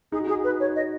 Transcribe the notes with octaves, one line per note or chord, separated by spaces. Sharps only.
D#4 G#4
F#4
D#4 G#4
B4
C#5
D#5